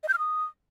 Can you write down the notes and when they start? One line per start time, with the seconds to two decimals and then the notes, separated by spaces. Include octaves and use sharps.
0.03 D#5
0.08 G6
0.14 F6
0.19 D#6